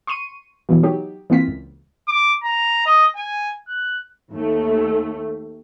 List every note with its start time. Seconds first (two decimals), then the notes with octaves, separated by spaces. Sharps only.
0.07 C6 C#6 D#7
0.69 B2 E3 F#3
0.83 F#3 D#4 G4
1.30 E3 A#3 C4 F4 B6
1.48 C#2
2.07 D6
2.43 A#5
2.86 D#5
3.16 G#5
3.68 F#6
4.30 D#2 A3